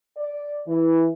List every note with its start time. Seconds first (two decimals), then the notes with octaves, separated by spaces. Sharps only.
0.17 D5
0.67 E3